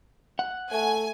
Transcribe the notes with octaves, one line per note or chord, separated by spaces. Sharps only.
F#5
A3 G#5